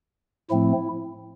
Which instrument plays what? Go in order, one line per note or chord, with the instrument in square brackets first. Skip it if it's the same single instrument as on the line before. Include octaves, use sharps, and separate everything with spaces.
[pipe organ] A2 F3 A3 C4 E4